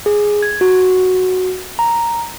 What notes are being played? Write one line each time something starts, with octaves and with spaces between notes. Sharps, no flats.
G#4
G#6
F#4
A#5